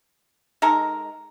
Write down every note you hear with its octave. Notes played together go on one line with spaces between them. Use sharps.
G#3 D#4 A4 A#4